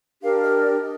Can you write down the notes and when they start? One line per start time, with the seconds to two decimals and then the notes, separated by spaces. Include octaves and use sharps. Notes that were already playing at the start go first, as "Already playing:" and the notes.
0.21 D4 G4 A#4 F5
0.41 D#5
0.60 D5
0.79 D#5